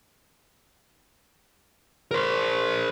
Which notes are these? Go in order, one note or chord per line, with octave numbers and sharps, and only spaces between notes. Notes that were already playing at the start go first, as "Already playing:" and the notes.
A#4 C5